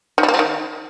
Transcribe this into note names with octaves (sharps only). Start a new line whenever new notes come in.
D#3
G3
A#3
F3
D#3